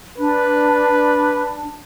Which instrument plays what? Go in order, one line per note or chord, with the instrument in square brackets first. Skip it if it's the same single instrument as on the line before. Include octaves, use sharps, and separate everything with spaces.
[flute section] D4 [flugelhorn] B4